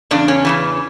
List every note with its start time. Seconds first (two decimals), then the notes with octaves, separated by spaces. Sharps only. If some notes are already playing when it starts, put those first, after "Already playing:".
0.11 E2 C#3 D4
0.28 C#4
0.45 E2 C#3 E3